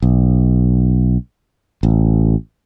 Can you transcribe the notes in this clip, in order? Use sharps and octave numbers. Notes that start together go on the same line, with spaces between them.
B1
A1